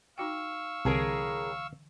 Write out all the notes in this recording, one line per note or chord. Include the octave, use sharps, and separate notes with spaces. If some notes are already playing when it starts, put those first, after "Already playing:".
D#4 F#4 F5 G5 C#6 E6
C2 A2 D3 E3 G#4 A#4